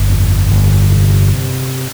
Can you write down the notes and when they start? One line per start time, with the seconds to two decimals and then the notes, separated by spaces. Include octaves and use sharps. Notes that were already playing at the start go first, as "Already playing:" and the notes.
Already playing: G1
0.09 F2
0.51 G1
0.92 C3